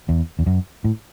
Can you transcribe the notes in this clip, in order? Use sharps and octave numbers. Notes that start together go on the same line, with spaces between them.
E2
E2
F#2
A2